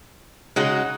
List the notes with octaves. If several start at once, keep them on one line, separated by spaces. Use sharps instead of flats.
C#3 G#3 D#4 F#4